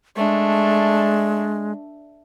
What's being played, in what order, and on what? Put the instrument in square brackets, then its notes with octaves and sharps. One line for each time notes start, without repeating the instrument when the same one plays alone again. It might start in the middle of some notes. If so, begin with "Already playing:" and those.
[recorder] G#3 [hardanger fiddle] A3 D4